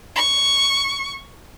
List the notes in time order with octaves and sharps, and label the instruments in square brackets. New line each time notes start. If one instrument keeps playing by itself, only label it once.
[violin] C#6